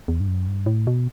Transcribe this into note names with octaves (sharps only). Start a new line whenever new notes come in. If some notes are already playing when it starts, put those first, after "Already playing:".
E2
G2
F#2
G2
A2
B2